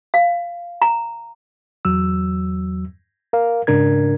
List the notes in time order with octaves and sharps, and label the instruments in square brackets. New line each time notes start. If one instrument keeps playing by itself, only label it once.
[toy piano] F5
A#5
[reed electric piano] E2 F#3 E6
A#4 F5
G#2 C#3 D4 A#4 G#6